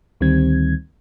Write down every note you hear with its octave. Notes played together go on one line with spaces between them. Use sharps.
D2 D#3 G3 C4 G#6